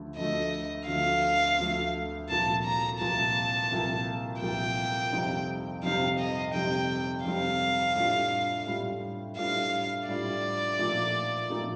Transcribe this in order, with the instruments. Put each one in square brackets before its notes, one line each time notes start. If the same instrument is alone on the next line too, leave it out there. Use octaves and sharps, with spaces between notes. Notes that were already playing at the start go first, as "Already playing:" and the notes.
Already playing: [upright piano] D2 D3 F3 A3
[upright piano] D2 D3 F3 A3 [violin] D#5
[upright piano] D2 D3 F3 A3 [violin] F5
[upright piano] D2 D3 F3 A3
[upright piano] C2 A#2 F3 [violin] A5
[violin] A#5
[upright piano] C2 A#2 F3 [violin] A5
[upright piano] C2 A#2 F3
[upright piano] C2 A#2 F3 [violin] G5
[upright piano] F2 C3 G3 C4 D#4
[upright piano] F2 C3 G3 C4 D#4 [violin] F5
[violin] D#5
[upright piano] F2 C3 G3 C4 D#4 [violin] G5
[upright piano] F2 C3 G3 C4 D#4 [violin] F5
[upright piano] A2 G3 D4 F4
A2 G3 D4 F4
[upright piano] A2 G3 D4 F4 [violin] F5
[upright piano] A2 G3 D4 F4 [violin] D5
[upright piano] A#2 F3 A3 D#4
A#2 F3 A3 D#4